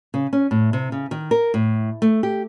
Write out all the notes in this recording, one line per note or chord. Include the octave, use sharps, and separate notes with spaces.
C#3
C#4
A2
C3
C#3
D#3
A#4
A2
A3
G4